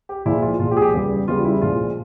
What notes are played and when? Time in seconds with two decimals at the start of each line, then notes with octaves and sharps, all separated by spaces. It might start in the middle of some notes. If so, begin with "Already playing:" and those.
0.09 G4
0.26 A#2 F3 G#3 E4
0.42 F4
0.60 A#2 F3 G#3 F4
0.71 G4
0.77 G#4
0.82 G4
0.93 E2 C#3 G3
1.27 E2 C#3 G3 F4
1.45 E4
1.61 A#2 F3 G#3 F4